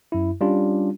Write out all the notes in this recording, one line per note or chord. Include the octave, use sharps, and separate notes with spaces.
F#2 E4
G3 C#4 D4 F4 G4